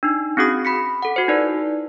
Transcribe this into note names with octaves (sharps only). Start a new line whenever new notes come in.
D4 D#4
C4 C#4 F#4 G#4 D#6
B5 B6 C#7
A4 F#5
F#4 C5
D#4 E4 B4 D5